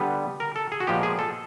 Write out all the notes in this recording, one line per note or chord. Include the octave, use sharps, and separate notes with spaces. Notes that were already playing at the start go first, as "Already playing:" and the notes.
Already playing: D3 G3 B3
A#4
A4
G#4
F#4
A#2 F3 G#3 B3 G4
G#4
A4